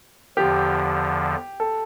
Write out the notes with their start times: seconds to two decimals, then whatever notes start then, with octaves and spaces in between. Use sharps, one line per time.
0.37 E2 D3 F3 G4
1.60 A4